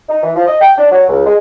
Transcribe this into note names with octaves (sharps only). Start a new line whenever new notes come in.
D#4
E3
F3
D#5
G5
D4
F#3
C#2
G#3